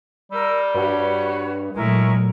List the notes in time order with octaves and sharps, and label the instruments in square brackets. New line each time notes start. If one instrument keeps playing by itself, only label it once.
[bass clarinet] G3 [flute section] A#4 E6
[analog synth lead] G2 [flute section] F#4 B4 C#5
[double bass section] A#2 F#3 A3 [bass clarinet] G#3 [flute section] E4 A#4 C#6